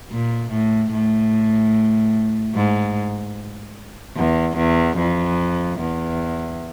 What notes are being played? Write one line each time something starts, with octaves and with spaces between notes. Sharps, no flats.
A#2
A2
A2
G#2
E2
E2
F2
E2